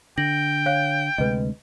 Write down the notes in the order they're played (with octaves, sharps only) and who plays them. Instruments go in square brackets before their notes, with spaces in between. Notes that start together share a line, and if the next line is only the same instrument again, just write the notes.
[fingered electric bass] D3 [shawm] G5 [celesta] A#6 F#7
[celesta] C#5 F5 F#6
[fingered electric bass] D2 C3 G#3 [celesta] B4 D#5